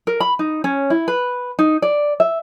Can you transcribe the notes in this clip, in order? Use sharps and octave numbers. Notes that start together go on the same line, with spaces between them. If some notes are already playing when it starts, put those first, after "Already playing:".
A#4
B5
D#4
C#4
E4
B4
D#4
D5
E5